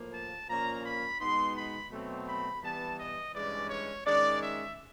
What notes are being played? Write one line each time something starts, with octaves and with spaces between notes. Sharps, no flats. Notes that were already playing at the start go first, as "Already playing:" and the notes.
Already playing: A2 F3 A#3
A5
A#2 F3 A#3 C#4 A#5
B5
B2 G#3 B3 D#4 C6
B5
B2 F#3 A3 C4
B5
E3 G3 B3 A5
D#5
G2 E3 G#3 C#4 D5
C#5
D#3 G#3 C#4 D5
E5